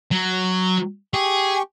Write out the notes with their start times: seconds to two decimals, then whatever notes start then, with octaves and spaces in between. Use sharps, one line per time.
0.12 F#3
1.14 G4 G#4 C#6